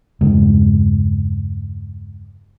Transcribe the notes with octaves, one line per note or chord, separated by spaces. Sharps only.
E2 G2 C#3 G#3